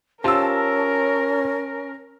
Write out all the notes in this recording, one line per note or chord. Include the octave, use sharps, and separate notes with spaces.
C#4 F4 G4 A#4 C5 A5 E6